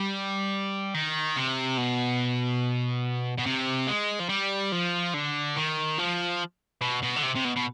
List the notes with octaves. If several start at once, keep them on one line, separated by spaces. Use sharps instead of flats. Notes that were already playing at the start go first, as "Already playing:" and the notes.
Already playing: G3
D#3
C3
B2
B2
C3
G#3
F3
G3
F3
D3
D#3
F3
B2
B2
D3
C3
C3
B2
B2